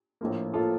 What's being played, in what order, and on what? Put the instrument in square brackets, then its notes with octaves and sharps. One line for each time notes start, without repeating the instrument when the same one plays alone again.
[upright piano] A#1 A2 F3 A#3
A2 F3 A#3 F4 A4